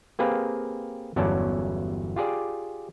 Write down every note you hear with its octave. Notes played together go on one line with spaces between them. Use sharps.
A#3 C4 G4 G#4 B4 F5
G1 E2 F#3 C#4 D5 A5
F4 G4 G#4 D5